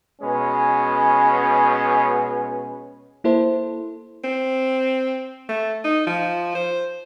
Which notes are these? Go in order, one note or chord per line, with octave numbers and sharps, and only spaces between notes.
B2 G#3 C#4 B4
A#3 E4 A4 C5
C4
A3
D#4
F3
C5